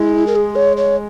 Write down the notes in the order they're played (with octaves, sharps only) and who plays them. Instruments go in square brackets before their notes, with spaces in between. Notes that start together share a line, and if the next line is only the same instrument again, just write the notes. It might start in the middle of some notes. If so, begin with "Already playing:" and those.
Already playing: [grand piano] G#3 [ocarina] E4
[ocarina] A#4
G#4
C#5
C#5